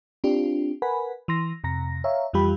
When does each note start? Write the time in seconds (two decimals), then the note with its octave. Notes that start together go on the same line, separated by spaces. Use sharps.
0.24 C4 D4 F4 G4
0.82 A#4 B4 F#5 G#5 B5
1.28 E3 C6 A#6
1.64 F2 C3 A#5 A#6
2.04 C#5 E5 F5 A#5
2.33 F2 E3 G3 F4 G4 B5